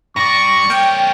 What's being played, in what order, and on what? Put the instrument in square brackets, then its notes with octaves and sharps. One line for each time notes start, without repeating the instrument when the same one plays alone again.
[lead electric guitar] G2 D5 [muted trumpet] C#6 [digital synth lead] A#6
[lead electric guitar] A#3 C#5 [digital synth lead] G5